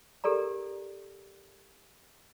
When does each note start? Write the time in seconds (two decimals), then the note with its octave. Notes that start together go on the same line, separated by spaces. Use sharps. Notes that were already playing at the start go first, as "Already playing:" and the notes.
0.24 G4 A4 A#4 D5 A#5